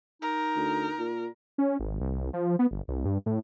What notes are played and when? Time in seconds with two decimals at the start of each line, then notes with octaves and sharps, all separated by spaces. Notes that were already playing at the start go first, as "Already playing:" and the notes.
0.22 D#4 A#4
0.56 D2
0.98 A#2
1.58 C#4
1.79 G#1
2.00 C2
2.33 F3
2.59 B3
2.71 G1
2.88 C2
3.05 G2
3.26 A2